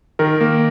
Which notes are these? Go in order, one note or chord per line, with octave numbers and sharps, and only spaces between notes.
D#3 A#4
A#3